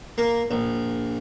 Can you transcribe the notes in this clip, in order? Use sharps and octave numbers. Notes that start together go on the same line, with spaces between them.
A#3
A#1